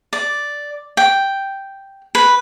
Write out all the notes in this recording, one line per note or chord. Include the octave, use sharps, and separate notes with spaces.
D5
G5
B4